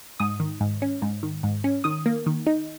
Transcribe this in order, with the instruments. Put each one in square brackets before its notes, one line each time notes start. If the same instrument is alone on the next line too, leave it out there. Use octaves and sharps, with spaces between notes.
[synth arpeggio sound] G#2 D#6
D#3
G#2
C#4
G#2
D#3
G#2
C#4
D#3 D#6
A#3
D#3
D#4